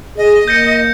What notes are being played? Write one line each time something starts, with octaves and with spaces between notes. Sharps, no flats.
G#4 D#5
A#3 G6 A#6 C#7